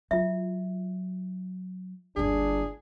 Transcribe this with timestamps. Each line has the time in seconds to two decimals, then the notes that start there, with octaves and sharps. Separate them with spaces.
0.11 F#3 F4 E5
2.16 G1 D#2 D4 G#4